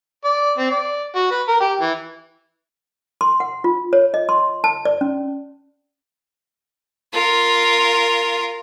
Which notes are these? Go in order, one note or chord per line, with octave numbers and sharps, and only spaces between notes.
D5
C4
D5
F#4
B4
A#4
G4
E3
C6
F#5
F4
C#5
D#5
C6
A5
D5
C#4
F4 A#4